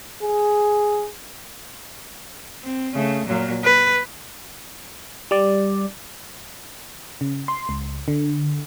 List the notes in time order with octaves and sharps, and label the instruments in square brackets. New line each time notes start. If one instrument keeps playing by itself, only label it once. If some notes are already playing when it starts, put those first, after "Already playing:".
[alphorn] G#4
[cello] C4
C#3 A3
A#2 F#3
B4
[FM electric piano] G3 D5
C#3
C6
C#2
D3